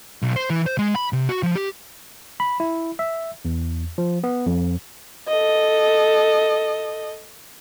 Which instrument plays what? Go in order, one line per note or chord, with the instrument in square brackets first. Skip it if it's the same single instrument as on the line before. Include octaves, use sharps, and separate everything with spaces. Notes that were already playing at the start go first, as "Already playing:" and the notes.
[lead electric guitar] B1
C5
E3
C5
G#3
B5
C3
F#4
F3
G4
[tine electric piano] B5
E4
E5
E2
F3
B3
F2
[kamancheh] A4 D#5